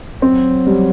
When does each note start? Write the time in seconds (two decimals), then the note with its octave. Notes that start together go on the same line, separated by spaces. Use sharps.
0.22 F#3 C4
0.67 G3